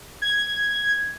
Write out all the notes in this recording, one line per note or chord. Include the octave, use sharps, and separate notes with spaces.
G#6